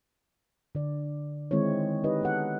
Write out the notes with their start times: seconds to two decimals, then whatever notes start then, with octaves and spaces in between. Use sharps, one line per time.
0.75 D3 D5
1.51 D#3 G#3 C4 E4 C#5
2.04 D#4 G4 B4 D#5
2.21 B3 A4 F#5